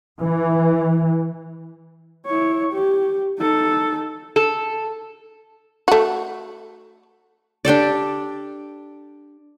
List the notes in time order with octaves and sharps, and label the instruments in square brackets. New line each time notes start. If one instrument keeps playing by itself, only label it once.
[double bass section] E3
[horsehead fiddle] E4 C#5
G4
D#4 A4
[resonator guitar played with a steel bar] A4
[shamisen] A3 F#4
[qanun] D4 G4 A4 D5